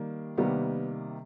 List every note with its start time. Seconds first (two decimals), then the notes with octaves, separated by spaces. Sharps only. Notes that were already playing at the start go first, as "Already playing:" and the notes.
Already playing: D#3 G3 A#3
0.37 C3 D#3 G3 A#3 B3